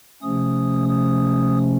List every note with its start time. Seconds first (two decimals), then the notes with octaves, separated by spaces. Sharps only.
0.22 C3 F3 A3 C#4 D#6
0.89 D#6